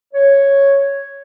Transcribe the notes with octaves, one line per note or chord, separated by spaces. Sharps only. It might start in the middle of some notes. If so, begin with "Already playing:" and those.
C#5